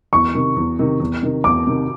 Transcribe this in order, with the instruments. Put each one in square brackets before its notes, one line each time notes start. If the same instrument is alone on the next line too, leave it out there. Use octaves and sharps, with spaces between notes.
[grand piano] E2 [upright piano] C#6
[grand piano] C3 D#3
E2
C3 D#3
E2
C3 D#3
[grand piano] E2 [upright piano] D6
[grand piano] C3 D#3